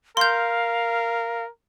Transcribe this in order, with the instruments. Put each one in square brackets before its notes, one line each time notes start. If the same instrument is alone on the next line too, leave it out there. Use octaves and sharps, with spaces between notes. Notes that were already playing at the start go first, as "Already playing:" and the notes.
[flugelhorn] A#4 [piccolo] F5 [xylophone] C6 G6